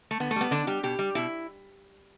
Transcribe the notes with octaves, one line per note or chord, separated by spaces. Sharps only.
A3
D3 B3
A3
G3 B3
D3 D4
G3 G4
B2 G4
G3
B2 E4